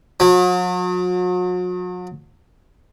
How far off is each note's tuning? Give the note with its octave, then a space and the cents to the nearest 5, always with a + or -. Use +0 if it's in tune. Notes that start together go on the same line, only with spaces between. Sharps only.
F#3 -40